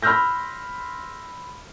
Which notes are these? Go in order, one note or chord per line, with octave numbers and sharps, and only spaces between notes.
B5 C6 E6 F6 G6 A#6